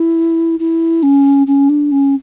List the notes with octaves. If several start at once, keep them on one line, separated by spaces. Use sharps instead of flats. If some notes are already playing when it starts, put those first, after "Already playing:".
Already playing: E4
E4
C#4
C#4
D4
C#4